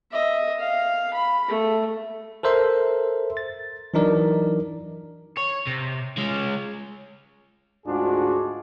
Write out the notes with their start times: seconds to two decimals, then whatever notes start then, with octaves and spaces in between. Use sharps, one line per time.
0.11 D#5 E5
0.60 F5
1.13 B5
1.48 A3
2.43 A4 A#4 C5 E5 C6
3.37 A6
3.94 E3 F#3 D4 D#4 A#4 D5
5.37 C#5
5.67 C3
6.18 G#3 C#4
7.86 D2 G#2 D4 F4 F#4 G#4